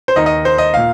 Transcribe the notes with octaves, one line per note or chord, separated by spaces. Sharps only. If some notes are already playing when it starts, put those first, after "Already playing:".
C5
D#2 D#3 D#5
D#5
C5
D#5
A#2 F5